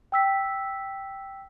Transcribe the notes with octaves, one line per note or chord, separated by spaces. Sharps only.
G5 E6 B6